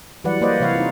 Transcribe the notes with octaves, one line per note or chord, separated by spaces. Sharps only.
E3 F#3 G3 B4 D5 F#5
A#3 B4 C5 D5 D#5 F#5
C3 E3 C#5 F5 F#5
D#4 F4